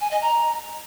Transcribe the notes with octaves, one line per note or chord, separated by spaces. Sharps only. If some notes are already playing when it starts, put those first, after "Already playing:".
G#5
D#5
A#5